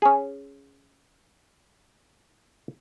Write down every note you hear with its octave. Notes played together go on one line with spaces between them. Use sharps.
C#4 G#4